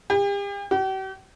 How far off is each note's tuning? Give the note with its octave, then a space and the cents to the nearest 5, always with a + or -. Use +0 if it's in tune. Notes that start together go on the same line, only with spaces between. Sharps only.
G4 +40
G4 -45